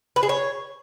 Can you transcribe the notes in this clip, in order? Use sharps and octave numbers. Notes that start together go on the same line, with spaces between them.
B4
G#4
C#5